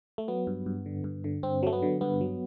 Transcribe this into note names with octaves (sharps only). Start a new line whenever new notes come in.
A3
F#3 B3
G2
G2
D3
G2
D3
G2 C4
F#3 A3
B3
D3
G2 B3
F#3